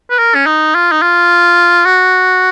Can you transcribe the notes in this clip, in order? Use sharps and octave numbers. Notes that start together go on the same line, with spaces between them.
B4
A#4
C#4
D#4
F4
D#4
F4
F#4